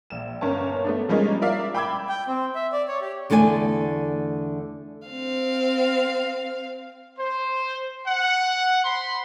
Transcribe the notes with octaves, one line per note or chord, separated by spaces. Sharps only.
A#1 E7
G1 C#4 A#4 C#5 A5
A3 B3 D4
F3 G3 G#3 A#3 C#4 D#4
F4 A#4 D5 E5 F5
G5 B5 D6 E6 G#6
G5
C4
E5
D5
C#5
G4
E2 D3 A3 E4 D5 G#5
C4 F5
C5
F#5
C5 B5 C6